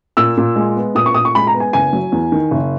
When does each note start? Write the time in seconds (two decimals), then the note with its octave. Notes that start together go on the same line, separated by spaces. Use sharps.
0.17 A#2 E6
0.37 A#2
0.56 G#3
0.76 B3
0.95 A#2 D#6
1.06 C#6
1.14 A#2 D#6
1.25 C#6
1.35 G#3 B5
1.47 A#5
1.54 B3
1.60 G#5
1.73 F#1 G#5
1.93 F#3
2.12 E2
2.32 D#3
2.51 F#1